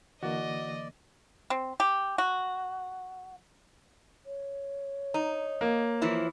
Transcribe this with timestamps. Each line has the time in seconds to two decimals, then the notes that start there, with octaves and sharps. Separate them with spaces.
0.23 D3 E3 A#3 F#4 D5 D#5
1.50 C4
1.80 G4
2.18 F#4
4.26 C#5
5.14 D#4
5.61 A#3
6.02 E3 F3 E4